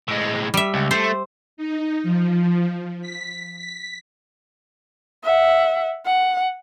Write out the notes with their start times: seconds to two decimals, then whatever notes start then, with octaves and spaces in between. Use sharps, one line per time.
0.08 A2 G#3
0.54 G3 E5
0.74 C#2
0.91 A3 C5
1.57 D#4
2.03 F3
3.02 B6
3.56 B6
5.24 E5 F#5
6.06 F#5